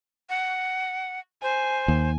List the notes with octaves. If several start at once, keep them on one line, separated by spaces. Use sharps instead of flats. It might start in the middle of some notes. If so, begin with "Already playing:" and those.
F#5
C5 G#5
D#2